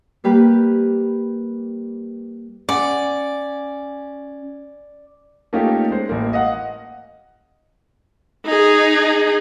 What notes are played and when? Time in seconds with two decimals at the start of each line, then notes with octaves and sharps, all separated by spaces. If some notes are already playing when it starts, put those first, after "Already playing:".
0.24 G3 A#3 G4 B4
2.69 C#4 D5 F#5
5.53 A3 A#3 C#4 D#4 F4 G4
5.91 G#3 C5
6.09 A1 A#3
6.33 D#5 F5 F#5
8.46 D#4 G#4